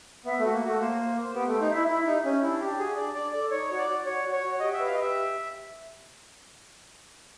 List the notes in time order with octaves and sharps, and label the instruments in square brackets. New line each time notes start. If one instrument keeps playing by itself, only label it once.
[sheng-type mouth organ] B3 [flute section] E5
[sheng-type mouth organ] A3 [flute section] F#4
[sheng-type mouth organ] A#3
[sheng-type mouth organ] A3 [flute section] F#4
[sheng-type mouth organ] A#3 [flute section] C5
[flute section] C5
C5
[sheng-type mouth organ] B3 [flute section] G4
[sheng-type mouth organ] A3
[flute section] C5
[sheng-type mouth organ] D#4
[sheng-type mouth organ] E4 [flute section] E5
[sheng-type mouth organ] E4 [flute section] E5
[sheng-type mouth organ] D#4 [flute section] G4
[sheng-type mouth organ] C#4 [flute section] G4
[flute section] D4 [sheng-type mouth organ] E4
[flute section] D4 [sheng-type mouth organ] G4
[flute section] F#4 [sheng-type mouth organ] G#4
[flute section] D4 [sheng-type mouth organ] D5
[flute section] D4 [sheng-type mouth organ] D5
[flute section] A4 [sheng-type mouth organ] D5
[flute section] D#4 [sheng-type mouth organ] C#5
[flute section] F#4 [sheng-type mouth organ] C#5
[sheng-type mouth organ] D5
[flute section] F#4
[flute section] F#4 [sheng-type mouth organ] C#5
[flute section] F#4
[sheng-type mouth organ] C#5
[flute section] F#4
[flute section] G4 [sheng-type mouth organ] D#5
[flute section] B4 [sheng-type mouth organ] E5
[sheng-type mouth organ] F5
[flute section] G4 [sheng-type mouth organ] D#5
[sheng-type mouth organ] E5